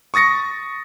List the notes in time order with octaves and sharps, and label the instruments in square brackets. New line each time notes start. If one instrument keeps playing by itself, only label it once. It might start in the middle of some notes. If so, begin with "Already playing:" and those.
[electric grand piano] C#6 D#6 A6 A#6 C#7